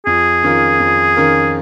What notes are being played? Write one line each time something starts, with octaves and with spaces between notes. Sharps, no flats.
F2 G#4
D#3 C#4 F4 A#4
F2
D#3 C#4 F4 A#4